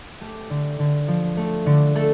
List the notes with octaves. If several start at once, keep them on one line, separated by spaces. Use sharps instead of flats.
A3 G4
D3
D3
F3
A3
D3
A3 A4